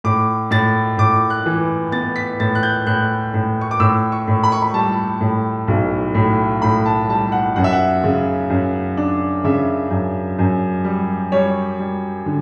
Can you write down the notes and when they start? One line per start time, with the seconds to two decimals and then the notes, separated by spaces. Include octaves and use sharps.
0.04 A2 D6
0.51 A2 A6
0.98 A2 D6
1.30 F#6
1.46 E3
1.92 B3 A6
2.16 B6
2.40 A2 A6
2.55 F#6
2.63 G6
2.86 A2 F#6
3.34 A2
3.61 C#6
3.71 D6
3.80 A2 E6
4.12 C#6
4.28 A2
4.43 B5
4.52 C#6
4.62 B5
4.74 G3 A5
5.21 A2
5.68 B1
6.15 A2
6.62 A2 B5
6.86 A5
7.09 G3 A5
7.32 F#5
7.56 F#2 F#5
7.64 E5
7.73 F#5
8.04 C#3
8.50 F#2
8.97 D4
9.44 C#3 E5
9.90 F#2
10.39 F#2
10.84 G3
11.32 G3 C#5
11.79 G3
12.26 D3